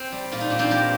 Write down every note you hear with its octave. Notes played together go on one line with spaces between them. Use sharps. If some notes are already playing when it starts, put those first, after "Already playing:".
Already playing: C4
G3
A#2 F4
D#4
A#2 D4
C4 D#4
G3 G4 A#4